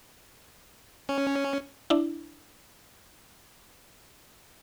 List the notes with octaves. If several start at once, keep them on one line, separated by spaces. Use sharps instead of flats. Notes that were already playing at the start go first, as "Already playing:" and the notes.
C#4
D4 E4